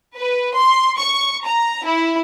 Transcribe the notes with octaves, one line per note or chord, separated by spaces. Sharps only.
B4
C6
C#6
A#5
E4